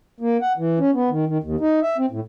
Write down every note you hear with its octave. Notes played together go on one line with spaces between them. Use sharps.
A#3
F#5
E3
C#4
B3
D#3
D#3
D#2
D#4
E5
C4
A2